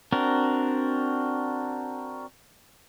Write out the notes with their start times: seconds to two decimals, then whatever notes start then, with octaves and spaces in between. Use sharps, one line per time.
0.13 C4 D4 F#4 A#4